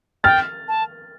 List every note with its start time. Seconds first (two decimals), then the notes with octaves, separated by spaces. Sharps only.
0.24 G5 F6 A6
0.68 A5